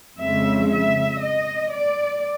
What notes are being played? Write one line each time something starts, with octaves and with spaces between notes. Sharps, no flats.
F2 C#3 F3 G#3 E5
E5
D#5
D5